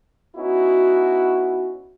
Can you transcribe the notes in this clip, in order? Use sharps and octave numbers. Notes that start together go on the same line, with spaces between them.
B3 C#4 D#4 E4 F#4